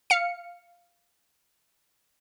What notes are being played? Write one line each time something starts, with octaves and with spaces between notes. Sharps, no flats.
F5 C#7